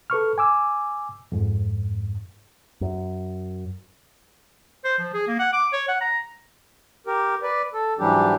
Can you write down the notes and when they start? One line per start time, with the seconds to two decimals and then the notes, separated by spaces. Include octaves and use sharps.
0.10 A4 B4 C#6 F6
0.38 G#5 D6 E6
1.32 F2 G#2
2.81 F#2
4.84 C5
4.99 F3
5.14 G#4
5.28 A#3
5.39 F#5
5.53 D6
5.73 C#5
5.88 F#5
6.01 A#5
7.07 G4 A#4
7.43 B4 D5
7.74 A4
7.99 G#2 E3 F#3 G3 D4 G4